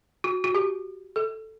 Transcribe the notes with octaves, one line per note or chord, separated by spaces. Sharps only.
F#4
F#4
G4
A4